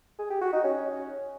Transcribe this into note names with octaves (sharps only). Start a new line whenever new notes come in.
G#4
G4
F#4
D#4
C#4